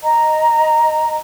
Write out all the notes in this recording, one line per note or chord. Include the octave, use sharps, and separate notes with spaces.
D#5 A#5